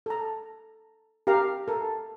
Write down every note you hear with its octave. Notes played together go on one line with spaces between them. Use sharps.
A4 A#5
G4 A#4 F5 A#5
A4 A#4